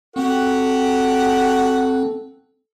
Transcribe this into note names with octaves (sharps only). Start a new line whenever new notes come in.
C4 F#4 G4 A4 F#5